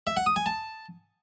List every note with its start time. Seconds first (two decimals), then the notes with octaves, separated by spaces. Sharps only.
0.07 E5
0.17 F#5
0.26 D#6
0.36 G#5
0.46 A5